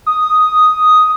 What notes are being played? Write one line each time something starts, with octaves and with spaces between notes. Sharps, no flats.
D#6